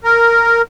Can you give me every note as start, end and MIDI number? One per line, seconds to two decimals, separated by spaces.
0.04 0.62 70